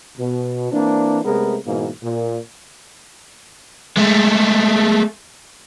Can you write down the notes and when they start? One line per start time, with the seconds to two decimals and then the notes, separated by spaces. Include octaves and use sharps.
0.18 B2
0.72 E3 A#3 C4 D4
1.24 C3 G#3 A3 B3 G#4 A#4
1.66 G#2 B2 E3 A#3
2.03 A#2
3.97 G#3 A3